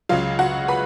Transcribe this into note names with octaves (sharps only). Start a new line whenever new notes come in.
C#2 C#3 F#3 F4 F5
F#4 F#5
B4 B5